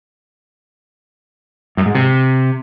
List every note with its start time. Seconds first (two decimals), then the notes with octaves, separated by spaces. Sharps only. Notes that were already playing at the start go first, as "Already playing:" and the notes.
1.77 F#2
1.86 G#2
1.95 C3